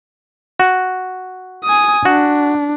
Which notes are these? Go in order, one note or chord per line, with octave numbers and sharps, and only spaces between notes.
F#4
G#5 D#6
D4 F#4